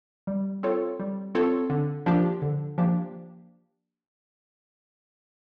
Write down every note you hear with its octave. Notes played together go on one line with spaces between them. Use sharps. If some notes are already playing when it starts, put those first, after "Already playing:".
G3
C4 F4 A4 C#5
G3
C4 F4 A4 C#5
D3
F3 A#3 D4 G4
D3
F3 A#3 D4 G4